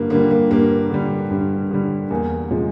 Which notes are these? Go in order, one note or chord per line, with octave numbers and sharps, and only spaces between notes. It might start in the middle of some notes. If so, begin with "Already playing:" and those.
Already playing: G2 D3 A#3
D3 G3 A#3
A#3
G2 A#3
D3 G3
G2
D3 G3
E2 A#3
C3 F3 G#3